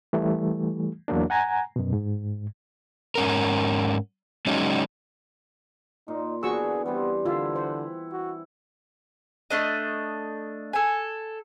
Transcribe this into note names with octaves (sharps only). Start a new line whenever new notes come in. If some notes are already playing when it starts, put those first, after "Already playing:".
E3 G3 A3
E2 F#3 A#3 D4
F#5 G#5 A#5
F#2 B2
G#2
G#2 C#4 A#4
F#3 G#3 C#4 D#4
A#2 D#4
D3 E3 B3 F#4 G#4 C#6 E6
E3 G3 B3 C4
D3 E4 F4
C5 F#5
F#4
A3 D4 D#5
A4 G#5